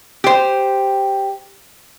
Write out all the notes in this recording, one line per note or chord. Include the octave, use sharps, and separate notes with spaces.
G4 C5